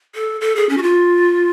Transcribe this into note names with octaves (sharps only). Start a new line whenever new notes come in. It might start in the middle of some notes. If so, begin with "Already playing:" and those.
A4
A4
G#4
C#4
F#4
F4